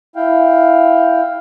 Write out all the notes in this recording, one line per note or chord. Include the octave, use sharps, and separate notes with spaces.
E4 F5 G5